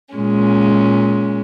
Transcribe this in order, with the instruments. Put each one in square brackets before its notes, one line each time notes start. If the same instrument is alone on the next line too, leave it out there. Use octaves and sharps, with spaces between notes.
[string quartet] A#2 G#3 C#4